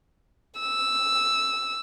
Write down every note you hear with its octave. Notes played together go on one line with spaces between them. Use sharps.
E6